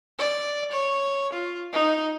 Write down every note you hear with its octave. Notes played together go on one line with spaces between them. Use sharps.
D5
C#5
F4
D#4